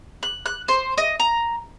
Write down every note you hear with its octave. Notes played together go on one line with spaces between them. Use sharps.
F#6
F#6
C5
D#5
A#5